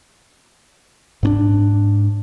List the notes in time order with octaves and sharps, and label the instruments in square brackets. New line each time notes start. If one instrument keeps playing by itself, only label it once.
[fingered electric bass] G#2 C#4 D4